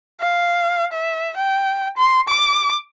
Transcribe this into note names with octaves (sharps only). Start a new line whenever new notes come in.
F5
E5
G5
C6
D6